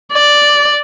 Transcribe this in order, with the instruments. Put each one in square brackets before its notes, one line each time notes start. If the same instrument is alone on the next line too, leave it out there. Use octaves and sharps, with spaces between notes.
[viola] D5